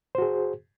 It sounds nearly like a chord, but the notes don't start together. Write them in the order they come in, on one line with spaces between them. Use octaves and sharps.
C5 F#4 G#4